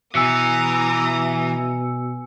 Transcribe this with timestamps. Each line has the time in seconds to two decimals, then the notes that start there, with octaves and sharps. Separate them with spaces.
0.15 B2 E3 G#5 A#5 D#6 E6 C#7